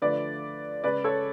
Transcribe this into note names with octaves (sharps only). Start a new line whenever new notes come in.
D3 F3 A3 B4 D5
C#3 G#3 B4 D5
A4 C#5